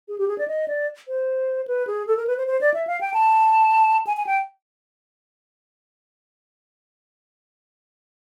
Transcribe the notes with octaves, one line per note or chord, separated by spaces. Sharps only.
G#4
G4
G#4
D5
D#5
D5
C5
B4
G#4
A4
A#4
B4
C5
C5
D5
E5
F5
G5
A5
G#5
G#5
G5